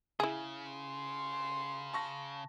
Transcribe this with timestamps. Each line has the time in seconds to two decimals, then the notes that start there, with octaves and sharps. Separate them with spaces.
0.20 C#3 E4 G#4
0.72 C6
1.93 A5 C#6 A#6